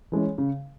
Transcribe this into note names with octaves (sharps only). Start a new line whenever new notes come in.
E3 G#3 C#4
C#3